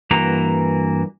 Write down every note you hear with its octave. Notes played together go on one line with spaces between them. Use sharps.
G2 E3 A#3 F#4 A#5